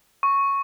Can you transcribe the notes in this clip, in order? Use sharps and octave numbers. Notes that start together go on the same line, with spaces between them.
C#6